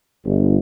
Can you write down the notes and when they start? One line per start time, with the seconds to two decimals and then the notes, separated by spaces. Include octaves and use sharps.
0.25 G1